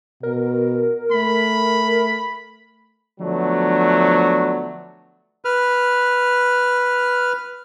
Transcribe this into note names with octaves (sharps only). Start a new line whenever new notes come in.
B2 A#4
A3 B5
D3 F3 F#3 A3 B3 D4
B4 F6